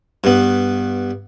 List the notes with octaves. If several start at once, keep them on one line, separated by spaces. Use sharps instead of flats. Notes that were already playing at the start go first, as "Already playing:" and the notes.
G2 B3